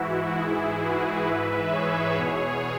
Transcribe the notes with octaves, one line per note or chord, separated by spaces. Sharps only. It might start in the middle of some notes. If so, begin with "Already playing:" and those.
Already playing: G#2 E3 E4 F#4
G#2 E3 E4 G#4
F#4 B4
G#2 E3 B4 E5
G#4 C#5
E2 B2